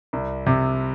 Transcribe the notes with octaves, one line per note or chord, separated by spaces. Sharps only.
C2
C3